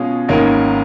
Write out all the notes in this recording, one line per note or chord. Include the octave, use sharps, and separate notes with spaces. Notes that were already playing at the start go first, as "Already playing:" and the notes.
Already playing: B2 G#3 C#4 F4 G#4
G#1 G#2 D#3 A#3 C#4